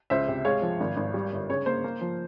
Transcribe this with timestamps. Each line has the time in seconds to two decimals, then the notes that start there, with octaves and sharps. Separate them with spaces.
0.10 C#2 C5 E5
0.28 C3
0.45 G#3 C#5 F5
0.62 F3
0.80 G#1
0.97 G#1
1.14 G3
1.32 G1
1.49 C#3 C#5
1.66 A#3 C5
1.84 A#3
2.01 F3